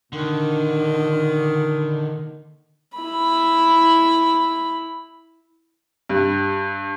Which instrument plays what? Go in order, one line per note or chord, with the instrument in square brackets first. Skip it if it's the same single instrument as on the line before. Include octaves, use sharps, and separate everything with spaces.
[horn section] A#2 D#3 [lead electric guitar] D3
[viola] E4 B5
[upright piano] G2